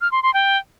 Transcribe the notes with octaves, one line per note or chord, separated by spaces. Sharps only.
F6
C6
C6
G5